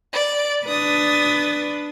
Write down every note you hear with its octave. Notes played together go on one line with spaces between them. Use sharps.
D5 D7
D4 B4 D#6 A6